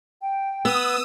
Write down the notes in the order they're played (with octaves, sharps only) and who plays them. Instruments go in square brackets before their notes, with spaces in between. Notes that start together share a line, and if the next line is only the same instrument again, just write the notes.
[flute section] G5
[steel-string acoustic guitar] B3 [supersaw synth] D#6 E6